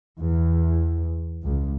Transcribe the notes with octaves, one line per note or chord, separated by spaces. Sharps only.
E2
C#2